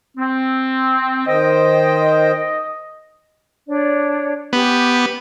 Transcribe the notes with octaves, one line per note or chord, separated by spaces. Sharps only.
C4
D#3 C5 D#5 G5
D4 C#5 D5
B3 G4 D6